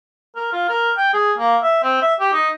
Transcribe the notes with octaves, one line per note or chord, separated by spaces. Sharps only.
A#4
F4
A#4
G5
G#4
A#3
E5
C4
E5
G4
D#4